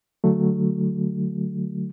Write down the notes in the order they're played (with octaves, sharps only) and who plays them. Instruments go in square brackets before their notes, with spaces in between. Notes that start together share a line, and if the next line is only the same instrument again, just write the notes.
[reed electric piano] D3 F#3 A3